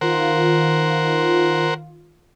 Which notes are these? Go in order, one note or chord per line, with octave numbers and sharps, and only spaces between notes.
D#3 F4 A#4 C5 F#5